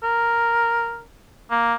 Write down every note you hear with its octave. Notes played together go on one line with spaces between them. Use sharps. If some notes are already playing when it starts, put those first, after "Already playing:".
A#4
A#3